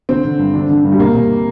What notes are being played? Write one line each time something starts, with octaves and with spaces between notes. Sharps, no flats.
D3 C4
D3
G2
D3 D4
D3
G2
G3
C3 A#3
C3